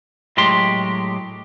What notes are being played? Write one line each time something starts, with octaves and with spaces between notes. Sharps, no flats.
A2 F#3 G#3 G4 C6